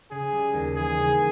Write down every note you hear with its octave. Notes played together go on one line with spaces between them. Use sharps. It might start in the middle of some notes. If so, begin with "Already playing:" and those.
C#3 G#4
G3
D#2
E3 G#4
C#3